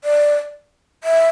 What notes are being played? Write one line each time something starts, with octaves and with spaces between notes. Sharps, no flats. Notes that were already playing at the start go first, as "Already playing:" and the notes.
D5
E5